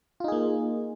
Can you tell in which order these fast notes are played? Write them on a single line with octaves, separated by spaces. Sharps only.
F4 D#4 G#4 A#3